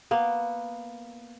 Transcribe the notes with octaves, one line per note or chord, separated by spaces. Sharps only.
A#3 B3